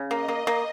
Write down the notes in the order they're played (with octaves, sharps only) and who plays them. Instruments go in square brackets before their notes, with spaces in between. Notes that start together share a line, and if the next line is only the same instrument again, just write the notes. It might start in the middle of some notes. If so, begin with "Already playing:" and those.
Already playing: [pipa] C#3
[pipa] A#3 [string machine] D#5
[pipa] A#3
A#3